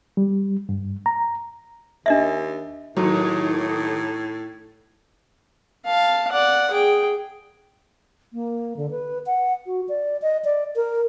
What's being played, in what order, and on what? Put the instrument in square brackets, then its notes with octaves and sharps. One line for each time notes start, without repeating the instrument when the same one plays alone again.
[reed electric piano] G3
G2
A#5
[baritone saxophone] D#2 [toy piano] D4 D#5 E5
[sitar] D#2 [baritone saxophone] A2 [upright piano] F#3
[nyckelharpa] F5 A5
D5 F#5
G#4 G5
[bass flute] A#3
D3
B4
F#5
F#4
D5
D#5
D5
A#4